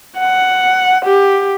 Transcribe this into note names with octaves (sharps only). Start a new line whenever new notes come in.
F#5
G4